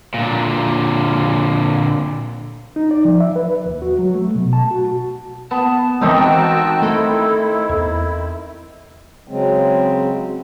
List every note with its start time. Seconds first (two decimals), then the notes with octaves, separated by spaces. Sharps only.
0.14 A#2 D3
2.76 D#4
2.91 D5
3.05 F3
3.20 E5
3.36 B4
3.66 D#2
3.82 F#4
3.99 F#3
4.15 A3
4.35 B2
4.53 A5
4.71 F#4
5.51 B3 A5
6.01 D#3 E3 G#3 C4 D#4 G4 A4 E5
6.17 F#4 G5 A5
6.82 A3 E4 A4
7.69 E2
9.28 C#3 F#3 G#3 C4